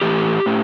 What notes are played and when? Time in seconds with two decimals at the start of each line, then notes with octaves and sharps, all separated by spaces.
0.01 A2 E3 G4
0.46 A2